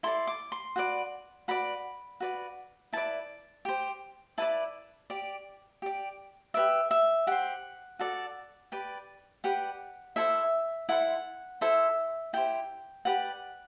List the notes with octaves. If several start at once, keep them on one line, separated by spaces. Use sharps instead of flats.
E4 A4 D5 C6
D6
C6
F#4 B4 D5
F#4 B4 D5 B5
F#4 B4 D5
E4 B4 D5 A5
G4 C5
E4 B4 D5 A5
G4 D5
G4 D5
G4 B4 D5 E5
E5
G4 C5 F#5
F#4 A4 D5
G4 B4 D5
G4 B4 D5 F#5
E4 A4 C5 E5
E4 A4 C5 F#5
E4 A4 C5 E5
E4 G4 C5 G5
G4 B4 D5 F#5